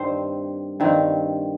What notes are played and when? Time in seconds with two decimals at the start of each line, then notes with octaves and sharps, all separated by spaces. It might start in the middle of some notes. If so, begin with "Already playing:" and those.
Already playing: G2 D#3 C4 C5
0.80 G2 D#3 C4